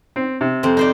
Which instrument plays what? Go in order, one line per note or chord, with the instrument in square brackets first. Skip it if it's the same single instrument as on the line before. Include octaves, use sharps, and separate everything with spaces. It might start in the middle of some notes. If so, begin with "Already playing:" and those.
[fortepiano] C4
C3
[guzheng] F2 C4
D#4 C5 D5